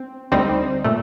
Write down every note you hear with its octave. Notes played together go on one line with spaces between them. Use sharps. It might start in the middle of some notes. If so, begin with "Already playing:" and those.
Already playing: C4
D2 D3 G3 C4 D#4
A#2 A3